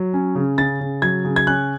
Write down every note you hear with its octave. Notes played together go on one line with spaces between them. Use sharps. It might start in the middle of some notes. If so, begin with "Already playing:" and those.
Already playing: F#3
C#4
C#3
C#3 A6
C#3
F#3 G#6
C#3
G#6
C#4 F#6